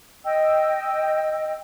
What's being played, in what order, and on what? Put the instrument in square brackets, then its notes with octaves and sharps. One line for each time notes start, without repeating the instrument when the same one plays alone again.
[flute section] D#5 G5 E6